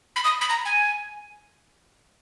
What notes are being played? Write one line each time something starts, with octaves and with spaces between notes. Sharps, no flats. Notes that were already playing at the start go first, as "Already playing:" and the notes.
B5
D#6
B5
A#5
G#5